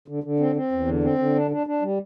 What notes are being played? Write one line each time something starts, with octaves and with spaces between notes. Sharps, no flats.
D3
D3
C4
C4
E2
D3
C4
D3
D4
D4
D4
G3